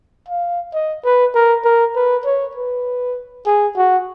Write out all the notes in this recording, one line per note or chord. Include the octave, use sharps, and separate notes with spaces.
F5
D#5
B4
A#4
A#4
B4
C#5
B4
G#4
F#4